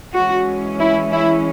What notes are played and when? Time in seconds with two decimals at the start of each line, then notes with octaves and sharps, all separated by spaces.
0.14 E3 G#3 C#4 F#4
0.79 E4
1.12 E4